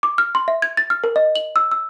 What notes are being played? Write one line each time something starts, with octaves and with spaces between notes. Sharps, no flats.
D6
F6
C6
E5
G#6
A6
F6
A#4
D#5
F#7
E6
E6